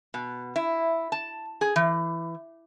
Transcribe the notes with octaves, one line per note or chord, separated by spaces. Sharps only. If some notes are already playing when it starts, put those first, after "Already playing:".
B2
E4
A5
G#4
E3